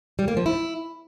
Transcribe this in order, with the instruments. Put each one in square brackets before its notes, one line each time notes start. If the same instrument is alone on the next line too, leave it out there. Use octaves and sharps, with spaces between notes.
[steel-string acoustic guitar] G3
A#3
F3
E4